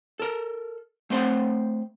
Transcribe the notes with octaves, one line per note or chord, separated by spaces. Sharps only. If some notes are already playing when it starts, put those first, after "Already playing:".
A4 A#4
A3 C4 C5 C#5 F#5